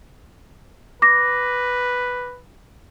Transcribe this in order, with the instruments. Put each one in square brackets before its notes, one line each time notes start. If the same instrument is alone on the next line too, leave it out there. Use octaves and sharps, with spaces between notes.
[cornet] B4 [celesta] D6 A#6